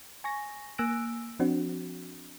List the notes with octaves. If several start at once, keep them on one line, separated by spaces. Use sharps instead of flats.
G#5 C#6 A#6
A#3 G#5 E6 F#6 A#6 D7
F3 C4 D4 F#4